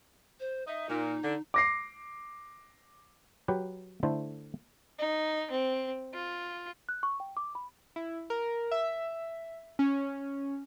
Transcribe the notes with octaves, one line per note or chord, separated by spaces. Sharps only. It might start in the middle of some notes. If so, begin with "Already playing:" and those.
C5
D#4 E5
A#2 D#4
D3
D6 A#6 C7
F#3 G4 B4
D3 A3 E4 C5 A5
D#4
C4
F4
F#6
C#6
G5
D6
B5
E4
A#4
E5
C#4